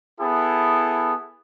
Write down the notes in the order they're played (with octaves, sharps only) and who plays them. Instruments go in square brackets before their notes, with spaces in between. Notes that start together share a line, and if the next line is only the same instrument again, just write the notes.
[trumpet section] B3 E4 G#4 A4